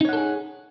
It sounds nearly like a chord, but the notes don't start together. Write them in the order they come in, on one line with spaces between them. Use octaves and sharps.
D#4 C#5 F#5 A4 G#4